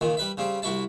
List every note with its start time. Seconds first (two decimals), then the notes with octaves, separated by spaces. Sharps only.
0.01 C#2 A#2 D#3
0.17 G3 B4 E5
0.37 C#3 G3 C4
0.62 C2 E4 F#4 E5 A5